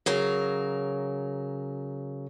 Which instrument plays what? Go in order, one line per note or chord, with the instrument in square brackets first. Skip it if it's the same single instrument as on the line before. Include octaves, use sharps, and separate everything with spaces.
[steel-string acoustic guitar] C#3 F#3 A#4